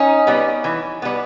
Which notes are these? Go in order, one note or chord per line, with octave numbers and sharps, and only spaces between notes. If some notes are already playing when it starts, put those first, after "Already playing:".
Already playing: C#4 D#4
G3 B3
E3
G3 B3